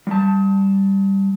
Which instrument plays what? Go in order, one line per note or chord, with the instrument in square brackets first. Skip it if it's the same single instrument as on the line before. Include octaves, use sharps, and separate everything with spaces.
[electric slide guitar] G3 A5